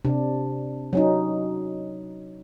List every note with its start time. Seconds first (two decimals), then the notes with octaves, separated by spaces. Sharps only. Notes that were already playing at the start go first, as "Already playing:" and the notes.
0.05 C3 D4
0.93 F#3 C#4 D#4